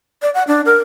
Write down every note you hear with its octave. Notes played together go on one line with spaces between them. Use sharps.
D5
F#5
D4
A#4